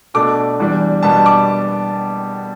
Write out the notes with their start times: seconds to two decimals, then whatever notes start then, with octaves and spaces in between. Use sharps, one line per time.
0.14 B2 A3 D4 D6
0.59 E2 E3 G3 D4
1.03 B2 G3 B3 D4 A5
1.26 D6